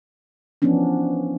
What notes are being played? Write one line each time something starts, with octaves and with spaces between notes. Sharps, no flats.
E3 F3 B3 C#4 D4